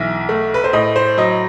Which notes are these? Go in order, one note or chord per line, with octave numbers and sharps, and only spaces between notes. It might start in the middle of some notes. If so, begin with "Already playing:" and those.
Already playing: B1 E3 E5
A3
B4
C5
A2 D#5
C5
F#3 D#5